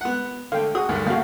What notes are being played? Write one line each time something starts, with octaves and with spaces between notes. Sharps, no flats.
B3 F#5
D3 A3 F5 G5
F#4 G#4 D#6
D2 G2 D#3
D#2 C#3 A3 F#4 F5